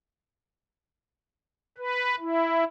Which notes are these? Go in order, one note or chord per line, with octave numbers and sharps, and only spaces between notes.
B4
E4